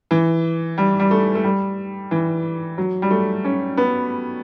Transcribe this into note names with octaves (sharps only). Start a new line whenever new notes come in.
E3
G3
G3
A3
A3
G3
E3
F#3
G3
A3
C#4
B3